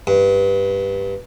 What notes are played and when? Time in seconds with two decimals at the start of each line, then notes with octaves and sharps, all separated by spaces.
0.07 G2